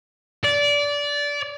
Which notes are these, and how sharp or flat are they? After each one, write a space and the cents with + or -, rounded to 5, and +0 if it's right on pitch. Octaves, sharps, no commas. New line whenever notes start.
D5 -20